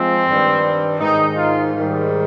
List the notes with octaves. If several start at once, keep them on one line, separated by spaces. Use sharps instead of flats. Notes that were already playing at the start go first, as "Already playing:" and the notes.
Already playing: F3 G#3 C4
G2 D#3 G3
G#2 D#3 G#3 D#4
F4
G#2 D#3 G3